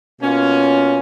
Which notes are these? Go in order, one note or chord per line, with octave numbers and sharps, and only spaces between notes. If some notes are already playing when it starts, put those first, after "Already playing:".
B2 A#3 C#4 F4